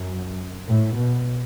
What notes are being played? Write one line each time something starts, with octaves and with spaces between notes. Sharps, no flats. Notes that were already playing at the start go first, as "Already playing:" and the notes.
Already playing: F#2
A2
B2